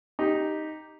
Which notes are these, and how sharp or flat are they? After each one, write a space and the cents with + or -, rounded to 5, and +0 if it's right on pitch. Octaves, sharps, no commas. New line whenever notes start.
D#4 +0 G4 +0